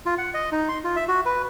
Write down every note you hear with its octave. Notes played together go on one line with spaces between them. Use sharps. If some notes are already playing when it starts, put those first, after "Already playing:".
F4
F#5
D#5
D#4
C6
F4
E5
F#4
B4